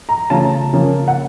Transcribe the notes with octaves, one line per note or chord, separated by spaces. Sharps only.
A#5
C#3 A3 C#4 F4 A5
C#3 F3 A#3 C#4
F#5